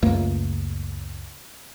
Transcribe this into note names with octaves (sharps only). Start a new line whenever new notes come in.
C#2 F#2 A3 A#3